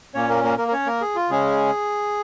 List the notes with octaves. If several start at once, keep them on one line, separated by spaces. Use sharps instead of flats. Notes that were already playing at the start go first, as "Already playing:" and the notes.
A#2 A#3 C#4 C#5
A#3 A#4
A#3 A#4
A#3 A#4
A#4
C#4 C#5
A#3 A#4
G#4
F4
C#3 G#3 C#4 G#4